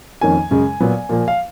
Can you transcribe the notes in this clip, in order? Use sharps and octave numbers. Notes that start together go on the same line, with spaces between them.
F2 D#3 A#3 C#4 G#5
F#2 C#3 G#3
A#2 F#3 B3
A#2 F3 A#3
F5